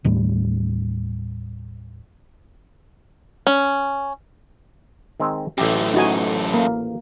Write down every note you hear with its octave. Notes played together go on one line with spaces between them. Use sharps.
D#2 A2 G3
C#4
D#3 G#3 C4
A1 F#2 A3 G4
D#4 F#4 G#5
A#3